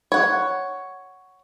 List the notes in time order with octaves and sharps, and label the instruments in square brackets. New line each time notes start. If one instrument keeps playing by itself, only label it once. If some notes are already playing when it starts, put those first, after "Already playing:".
[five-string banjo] C#5 F#5